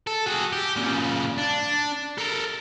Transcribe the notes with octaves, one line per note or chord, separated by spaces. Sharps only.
A4
F#4 G#4
G4
A#2 C#3
D4
A4 A#4